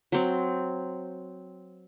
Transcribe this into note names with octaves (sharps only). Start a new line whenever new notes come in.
F#3 C4